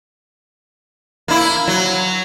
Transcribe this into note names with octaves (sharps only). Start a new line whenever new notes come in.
A#3 E4
F#3